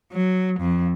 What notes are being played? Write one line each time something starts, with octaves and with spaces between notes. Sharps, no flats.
F#3
F2